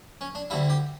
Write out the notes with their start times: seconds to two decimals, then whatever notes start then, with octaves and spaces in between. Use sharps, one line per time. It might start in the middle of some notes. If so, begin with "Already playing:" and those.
0.21 C#4
0.35 D4
0.50 D2 D3 G3 E4
0.70 G4